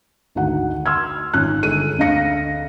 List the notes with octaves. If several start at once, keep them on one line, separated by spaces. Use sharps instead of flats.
G#1 D2 F#4 F#5
C6 E6 F6 G#6
G#1 C#4 F4 F#6
G1 G#3 A4 D#7
D2 D3 D#5 F5 A#6 C#7